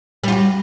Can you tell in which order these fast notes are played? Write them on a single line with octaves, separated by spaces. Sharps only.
G3 F4 F#4